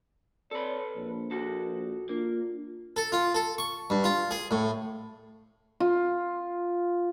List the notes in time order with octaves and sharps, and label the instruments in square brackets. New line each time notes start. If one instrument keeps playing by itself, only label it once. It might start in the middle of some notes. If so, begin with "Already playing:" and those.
[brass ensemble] C4 C#5 D5 [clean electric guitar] A4 B4
[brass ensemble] A#1
[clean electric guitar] F#4 A4
[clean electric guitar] A#3 [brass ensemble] D4 F4
[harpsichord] A4
F4
A4
C#6
G2
F4
G#4
A2
[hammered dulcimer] F4